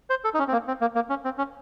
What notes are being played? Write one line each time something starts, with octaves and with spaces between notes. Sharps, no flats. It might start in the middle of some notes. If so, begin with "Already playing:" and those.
C5
A4
D#4
C#4
C4
A#3
C4
A#3
A#3
C#4
C4
C#4